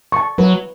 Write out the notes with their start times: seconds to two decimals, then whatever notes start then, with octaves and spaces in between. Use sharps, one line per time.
0.12 A5 C#6
0.38 F#3 B4